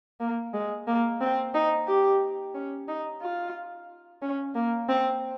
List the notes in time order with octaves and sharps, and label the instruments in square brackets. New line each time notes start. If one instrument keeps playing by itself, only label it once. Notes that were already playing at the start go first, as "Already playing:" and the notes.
[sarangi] A#3
G#3
A#3
C4
D#4
G4
C#4
D#4
F4
C#4
A#3
C4